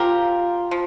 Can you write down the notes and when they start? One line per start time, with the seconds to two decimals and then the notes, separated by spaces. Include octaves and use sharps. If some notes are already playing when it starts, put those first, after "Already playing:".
Already playing: F3 C4 F4 G4 A#4
0.71 F3